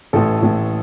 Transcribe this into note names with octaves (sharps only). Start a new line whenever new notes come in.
A1 A2 E3 A4
A1 A2 E3